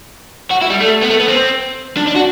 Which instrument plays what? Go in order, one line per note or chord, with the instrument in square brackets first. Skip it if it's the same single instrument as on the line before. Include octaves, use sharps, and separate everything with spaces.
[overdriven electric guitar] F#4
E4
G3
A3
B3
A3
B3
C4
D4
D4
F#4